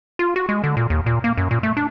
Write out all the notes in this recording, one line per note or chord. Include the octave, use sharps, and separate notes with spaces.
F4
F#4
G#3
D3
A#2
D#2
A#2
A#3
F#2
A#2
A3
D4